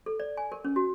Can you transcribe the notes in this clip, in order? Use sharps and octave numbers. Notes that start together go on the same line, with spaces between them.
A4
D5
G#5
A#4
C#4
F#4